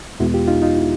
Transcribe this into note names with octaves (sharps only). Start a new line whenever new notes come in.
E2 B2 G#3 B3 E4 F#4
F4 G4
D#4 F4
D#4 F4
E4